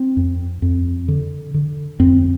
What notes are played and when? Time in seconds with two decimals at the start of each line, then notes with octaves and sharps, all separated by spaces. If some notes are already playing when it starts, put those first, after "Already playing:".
Already playing: C4
0.17 F2
0.62 F2
1.08 D3
1.54 D3
2.00 F2 C4